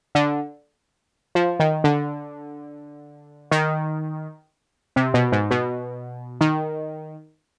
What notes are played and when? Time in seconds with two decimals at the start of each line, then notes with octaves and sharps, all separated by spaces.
0.15 D3
1.35 F3
1.60 D#3
1.84 D3
3.51 D#3
4.96 C3
5.14 B2
5.32 G#2
5.51 B2
6.41 D#3